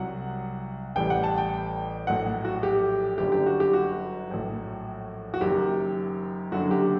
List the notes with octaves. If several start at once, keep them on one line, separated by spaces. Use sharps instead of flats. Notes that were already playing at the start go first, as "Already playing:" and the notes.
Already playing: C2 C3 F#3 F#5
A1 A2 G3 G5
F#5
A5
G5
A#1 A2 F#3 F#5
F#4
G4
G1 F#2 D3 G3 G4
G4
F#4
G4
F#4
A#1 A2 F#3
F#4
F#1 F#2 D#3 F#3 G4
F#1 F#2 D3 F#3 F#4
G4